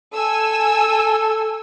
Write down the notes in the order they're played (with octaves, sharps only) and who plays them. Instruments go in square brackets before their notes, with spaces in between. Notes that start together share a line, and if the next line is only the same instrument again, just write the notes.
[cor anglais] A4 [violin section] G#5 E6